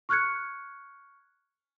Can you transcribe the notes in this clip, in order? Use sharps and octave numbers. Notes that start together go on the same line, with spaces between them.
C#6 F6 F#6 G#6 C#7